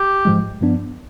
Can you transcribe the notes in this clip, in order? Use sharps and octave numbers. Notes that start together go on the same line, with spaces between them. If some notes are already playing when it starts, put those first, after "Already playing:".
Already playing: G4
G#2 F3 G#3
G2 F3 B3 D4